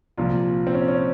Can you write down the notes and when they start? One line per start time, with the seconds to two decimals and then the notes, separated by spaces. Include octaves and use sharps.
0.17 C2 A#2 F3 F4
0.67 C4
0.75 C#4
0.88 C#4